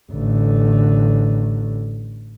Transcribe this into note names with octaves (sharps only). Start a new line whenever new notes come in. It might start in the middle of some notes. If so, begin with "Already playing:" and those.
A1 D3